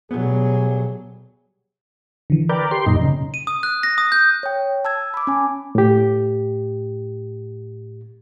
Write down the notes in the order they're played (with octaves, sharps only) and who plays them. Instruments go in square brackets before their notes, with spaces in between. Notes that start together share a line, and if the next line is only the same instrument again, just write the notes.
[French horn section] D2 G3 G#4 [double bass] B2 F#3 [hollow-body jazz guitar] B3
[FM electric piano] D3 E3
[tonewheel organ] A#4 B4 D5 [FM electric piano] G5 G6
[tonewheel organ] G4 C6
[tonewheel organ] F#2 A#2 D#4 [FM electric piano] D#5 A#5
[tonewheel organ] C#3
[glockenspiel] D#7
D#6
F#6
A#6
D#6
G6
[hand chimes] C#5 G5
A5 E6 G#6
B5 D6
C#4 G#5
[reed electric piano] A2 G4